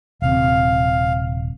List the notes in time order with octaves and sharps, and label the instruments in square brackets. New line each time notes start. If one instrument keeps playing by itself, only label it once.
[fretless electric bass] D#1 C3 [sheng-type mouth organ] F5